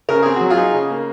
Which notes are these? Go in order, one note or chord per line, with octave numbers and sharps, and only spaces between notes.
C#3 A#4
C4 G#4
F#3 F#4
F4 G#4
D#4
C#3
A#3